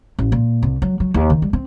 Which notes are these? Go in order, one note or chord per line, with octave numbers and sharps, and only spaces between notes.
A1
A#2
C2
F#3
F#3
D#2
D#3
G3
C4